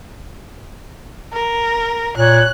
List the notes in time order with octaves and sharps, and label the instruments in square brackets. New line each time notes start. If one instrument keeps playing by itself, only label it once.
[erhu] A#4
[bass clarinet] A#2 [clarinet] C#5 [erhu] F#6